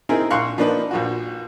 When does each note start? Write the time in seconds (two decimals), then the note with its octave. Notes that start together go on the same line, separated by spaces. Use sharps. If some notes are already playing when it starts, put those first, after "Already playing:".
0.09 C4 D#4 E4 G#4 A#4
0.30 A#1 F5 C6 C#6 F#6
0.58 F3 A#3 D4 D#4 B4
0.91 A#1 F3 F#4